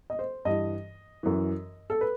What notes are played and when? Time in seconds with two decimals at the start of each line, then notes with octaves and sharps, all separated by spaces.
0.10 D#5
0.19 C5
0.45 G2 E3 D#5
1.23 F#2 E3
1.90 A4
2.01 B4